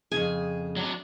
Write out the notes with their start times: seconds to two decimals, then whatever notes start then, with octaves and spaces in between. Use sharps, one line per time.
0.12 F2 C#3 G#4 G#5
0.77 F#3 D4